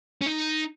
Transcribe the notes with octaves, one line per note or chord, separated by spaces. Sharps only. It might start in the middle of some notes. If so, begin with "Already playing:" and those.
C#4
D#4